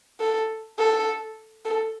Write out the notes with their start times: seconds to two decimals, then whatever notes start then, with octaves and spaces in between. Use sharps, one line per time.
0.20 A4
0.78 A4
1.65 A4